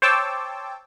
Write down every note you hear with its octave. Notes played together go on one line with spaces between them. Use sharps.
C5 C#5 G5 A5 D6 E6